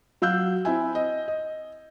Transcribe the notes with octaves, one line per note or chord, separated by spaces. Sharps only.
F#3 F5 E6 F#6 G6
C4 E4 E5 G#5
D#5
D#5